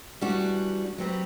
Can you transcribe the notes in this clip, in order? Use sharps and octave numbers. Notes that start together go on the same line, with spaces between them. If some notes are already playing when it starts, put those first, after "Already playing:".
E3 G3 D4 F#4
F#3 C4 G4 B4